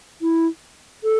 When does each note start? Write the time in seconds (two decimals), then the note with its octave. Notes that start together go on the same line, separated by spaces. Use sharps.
0.22 E4
1.04 A4